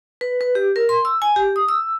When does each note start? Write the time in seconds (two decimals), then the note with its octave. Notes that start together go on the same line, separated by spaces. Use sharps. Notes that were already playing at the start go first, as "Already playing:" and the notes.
0.21 B4
0.41 B4
0.55 G4
0.76 A#4
0.89 C6
1.05 E6
1.22 G#5
1.36 G4
1.56 D#6
1.68 E6